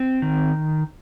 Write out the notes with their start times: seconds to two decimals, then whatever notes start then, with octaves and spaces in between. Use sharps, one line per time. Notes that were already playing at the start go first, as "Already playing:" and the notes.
Already playing: C4
0.22 D#3